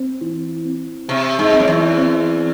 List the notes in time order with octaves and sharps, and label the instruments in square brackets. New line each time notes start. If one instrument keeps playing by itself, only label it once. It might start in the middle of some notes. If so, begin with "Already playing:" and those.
Already playing: [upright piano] C4
E3
C4
[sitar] C3 [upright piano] C4
[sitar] G#2
[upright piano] C4
[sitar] F#2
E2
[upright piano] C4